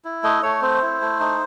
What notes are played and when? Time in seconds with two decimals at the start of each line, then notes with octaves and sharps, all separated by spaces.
0.05 E4
0.23 A3 D#5
0.43 A3 C#5
0.62 C4 C5
0.83 E4
1.01 A3
1.20 D#4